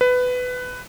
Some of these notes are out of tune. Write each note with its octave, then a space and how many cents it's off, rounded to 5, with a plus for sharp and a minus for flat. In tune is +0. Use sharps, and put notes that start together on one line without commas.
B4 +15